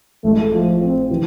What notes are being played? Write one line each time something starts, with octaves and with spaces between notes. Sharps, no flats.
A1 A2 G#3 A3
F3
C4
C3 E3